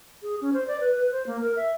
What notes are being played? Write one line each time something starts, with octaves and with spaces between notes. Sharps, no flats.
G#4
C#4
C5
D5
B4
B4
C5
A#3
A#4
E5